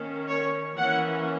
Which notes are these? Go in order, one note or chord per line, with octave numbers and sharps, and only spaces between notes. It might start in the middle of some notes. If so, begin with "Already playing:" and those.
Already playing: D#3 A#3 C#4
C#5
E3 A#3 C#4 F#5